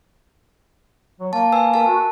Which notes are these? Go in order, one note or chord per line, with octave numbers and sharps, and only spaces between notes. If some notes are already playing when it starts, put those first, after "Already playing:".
F#3
A#3 A5
B4 G#5 E6
A#4 A5
F#4